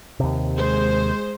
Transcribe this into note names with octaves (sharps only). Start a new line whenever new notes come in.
D#2 C3
G#3 C5